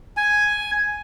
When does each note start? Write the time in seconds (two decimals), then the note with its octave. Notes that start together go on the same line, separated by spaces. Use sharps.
0.17 G#5